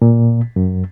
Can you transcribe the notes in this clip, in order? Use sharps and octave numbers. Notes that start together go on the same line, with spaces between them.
A#2
F#2